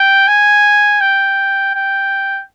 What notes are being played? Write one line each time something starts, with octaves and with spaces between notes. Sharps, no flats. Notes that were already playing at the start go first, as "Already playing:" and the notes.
Already playing: G5
G#5
G5
G5